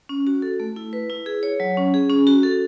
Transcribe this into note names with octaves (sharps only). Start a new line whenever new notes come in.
C#4
F#4
A4
A3
E4
B4
E4
G#4
C#5
F#3
C#4
G#4
C#4
F#4
A4